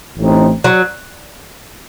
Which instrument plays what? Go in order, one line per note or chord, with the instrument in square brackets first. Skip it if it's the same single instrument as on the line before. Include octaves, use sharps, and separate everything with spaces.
[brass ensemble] A1 A2 A3 C4 D#4
[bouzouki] F#3